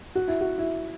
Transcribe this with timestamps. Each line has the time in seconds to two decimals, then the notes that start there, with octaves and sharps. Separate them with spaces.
0.15 F#4
0.28 E4
0.41 F#4
0.58 E4